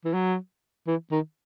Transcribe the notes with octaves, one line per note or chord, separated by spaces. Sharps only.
E3
F#3
E3
D#3